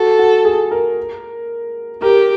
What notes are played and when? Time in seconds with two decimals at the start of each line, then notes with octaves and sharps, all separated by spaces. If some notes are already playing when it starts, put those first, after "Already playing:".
Already playing: F#4 A4
0.19 F#4
0.45 G#4
0.71 A#4
2.02 G4 A#4